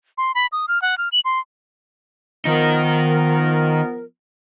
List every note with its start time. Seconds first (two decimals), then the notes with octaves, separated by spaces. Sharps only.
0.18 C6
0.35 B5
0.52 D#6
0.68 F6
0.82 F#5
0.98 F6
1.12 F#7
1.25 C6
2.45 D#3 F3 B3 D#4 A#4